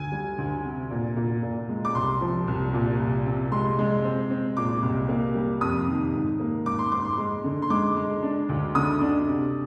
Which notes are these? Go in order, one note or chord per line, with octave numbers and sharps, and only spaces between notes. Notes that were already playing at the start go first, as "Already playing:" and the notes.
Already playing: D2 G#5
G3
D2
C3
A#2
A#2
A#2
G#3
D6
C2 C6
F3
C2
A#2
C2
C3
G#3 C6
G#3
C4
C4
A#2 D6
C2
A#3
G3
F2 D#6
D#3
G#2
A#3
G#2 D6
C6
G#2 D6
C6
G#3
D3
C6
G#3 D6
G#3
D4
D2
D3 D#6
D4
C3